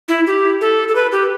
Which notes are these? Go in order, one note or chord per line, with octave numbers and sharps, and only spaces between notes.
E4
G4
A4
A4
B4
G4